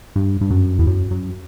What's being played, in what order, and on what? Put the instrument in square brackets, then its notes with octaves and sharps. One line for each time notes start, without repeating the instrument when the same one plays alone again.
[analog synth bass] G2
G2
F#2
E2
F#2
F#2